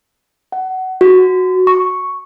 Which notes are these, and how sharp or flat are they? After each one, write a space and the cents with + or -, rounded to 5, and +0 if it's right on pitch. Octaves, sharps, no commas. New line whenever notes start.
F#5 +20
F#4 -5
C#6 +0